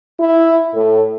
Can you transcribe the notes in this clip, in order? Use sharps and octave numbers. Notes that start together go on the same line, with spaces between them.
E4
A2 A4